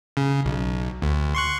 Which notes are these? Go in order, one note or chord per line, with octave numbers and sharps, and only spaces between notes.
C#3
B1
D2
C6 C#6 F#6